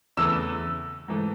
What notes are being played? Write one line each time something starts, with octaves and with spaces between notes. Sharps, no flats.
E2 C#3 E3 A3 E6
G#2 E3 A3